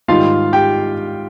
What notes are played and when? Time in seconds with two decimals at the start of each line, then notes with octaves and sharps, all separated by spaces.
0.08 G#2 D#3 G3 F4 F5
0.53 G4 G5